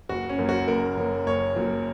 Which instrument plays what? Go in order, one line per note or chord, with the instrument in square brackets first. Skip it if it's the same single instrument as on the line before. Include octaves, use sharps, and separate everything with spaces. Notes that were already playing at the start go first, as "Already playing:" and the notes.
[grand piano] F#1 F#4
C#4
F#2 F#3 A#3
F#4
F#1 A#4
F#2 F#3 A#3
F#1 C#5
F#2 F#3 A#3